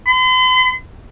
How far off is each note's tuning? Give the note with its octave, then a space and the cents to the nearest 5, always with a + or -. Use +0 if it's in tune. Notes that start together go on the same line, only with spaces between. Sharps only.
C6 -45